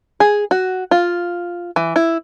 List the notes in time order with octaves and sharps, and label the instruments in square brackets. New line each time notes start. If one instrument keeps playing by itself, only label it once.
[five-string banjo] G#4
F#4
F4
E3
E4